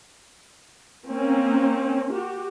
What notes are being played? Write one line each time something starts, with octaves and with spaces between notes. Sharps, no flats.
A#3 C4 C#4
F#4 G4